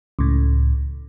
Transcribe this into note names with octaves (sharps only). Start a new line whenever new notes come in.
C#2 A2